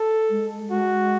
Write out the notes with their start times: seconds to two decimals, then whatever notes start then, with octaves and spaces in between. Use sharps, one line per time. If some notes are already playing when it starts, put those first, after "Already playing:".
Already playing: A4
0.30 G#3
0.71 G#3 F#4